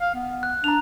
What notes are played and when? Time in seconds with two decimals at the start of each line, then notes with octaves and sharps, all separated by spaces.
0.01 F5
0.15 B3
0.43 F#6
0.64 D4 A#5 F7